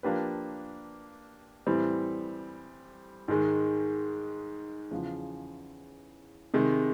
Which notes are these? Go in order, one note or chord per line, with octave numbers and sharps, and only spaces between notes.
F3 A#3 D4 G4 B4
A2 E3 G3 C4
G#2 D#3 G#3
E2 C#3 F3
C3 D#3 G#3